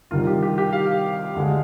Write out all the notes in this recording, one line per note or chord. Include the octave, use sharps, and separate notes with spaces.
C2 C3 D#3 G3 F4
G4
G4
G4
F5
D2 D3 G#3